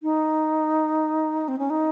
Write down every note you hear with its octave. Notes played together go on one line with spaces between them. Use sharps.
D#4
C4
C#4
D#4